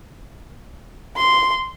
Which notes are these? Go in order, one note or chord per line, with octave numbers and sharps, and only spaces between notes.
C6